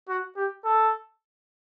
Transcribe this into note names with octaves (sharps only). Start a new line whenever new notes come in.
F#4
G4
A4